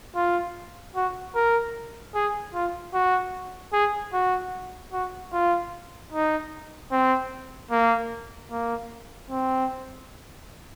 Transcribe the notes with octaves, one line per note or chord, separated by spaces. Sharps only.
F4
F#4
A#4
G#4
F4
F#4
G#4
F#4
F#4
F4
D#4
C4
A#3
A#3
C4